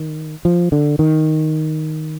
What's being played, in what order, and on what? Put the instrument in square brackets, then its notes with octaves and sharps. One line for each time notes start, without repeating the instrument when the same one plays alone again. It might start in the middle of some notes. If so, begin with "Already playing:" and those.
Already playing: [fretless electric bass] D#3
F3
D3
D#3